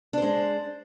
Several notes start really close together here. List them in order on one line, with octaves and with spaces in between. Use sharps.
D4 C5 G#3